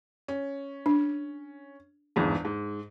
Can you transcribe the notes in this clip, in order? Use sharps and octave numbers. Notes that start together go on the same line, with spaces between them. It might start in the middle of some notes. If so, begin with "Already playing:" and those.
C#4
D4
G1 E2 G#2
G#2